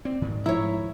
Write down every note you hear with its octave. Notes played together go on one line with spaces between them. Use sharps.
C4 D5
G#2 D#3
A2 F3 E4 C#5 A#5 E6